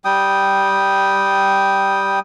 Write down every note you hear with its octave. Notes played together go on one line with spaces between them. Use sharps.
G3 G5 D#6